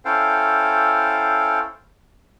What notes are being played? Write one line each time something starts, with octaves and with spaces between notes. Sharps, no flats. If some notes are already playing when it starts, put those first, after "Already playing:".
C#4 E4 A4 C5 F5 G5